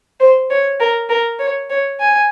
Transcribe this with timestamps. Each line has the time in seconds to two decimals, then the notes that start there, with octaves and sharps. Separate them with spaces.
0.20 C5
0.50 C#5
0.80 A#4
1.09 A#4
1.39 C#5
1.70 C#5
2.00 G#5